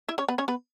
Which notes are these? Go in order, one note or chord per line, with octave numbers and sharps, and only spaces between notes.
E4 E5
C#4 C#5
B3 B4
C#4 C#5
B3 B4